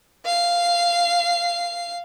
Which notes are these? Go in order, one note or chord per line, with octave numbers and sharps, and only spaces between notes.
F5 C7